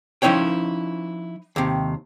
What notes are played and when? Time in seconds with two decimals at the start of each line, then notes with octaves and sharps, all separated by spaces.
0.22 F3 C#4 D#4 E4 C#5 G5
1.56 D#2 C3